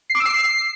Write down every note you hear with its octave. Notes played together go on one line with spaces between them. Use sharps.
C7
D6
E6
C7